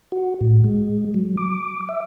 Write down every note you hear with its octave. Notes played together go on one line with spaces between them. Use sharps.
F#4
A2
G#3
F#3
D6
E5